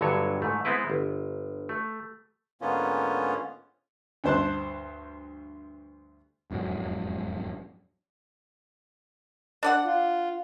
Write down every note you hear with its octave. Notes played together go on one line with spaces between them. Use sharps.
G1 G2 D3 F#3 A4 C#5
G#2 A3
G#3 B3 C4 E4 B4
G1
A3
G#2 D3 A#3 B3 C#4 F4
D2 G2 C5 A5 C6 F#6
E1 F2 G#2 F#3
D4 D5 F#5
F4